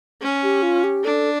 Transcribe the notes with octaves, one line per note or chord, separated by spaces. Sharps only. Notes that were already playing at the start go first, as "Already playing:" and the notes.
C#4
G4
F4
G4
D4 A4